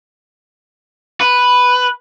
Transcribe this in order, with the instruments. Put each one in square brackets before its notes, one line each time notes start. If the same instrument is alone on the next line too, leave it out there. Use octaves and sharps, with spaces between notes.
[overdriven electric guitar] B4